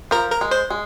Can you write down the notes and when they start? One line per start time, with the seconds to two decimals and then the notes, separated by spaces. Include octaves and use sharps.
0.11 F3 A#4
0.31 A#4
0.41 G#3
0.51 C5
0.70 G#3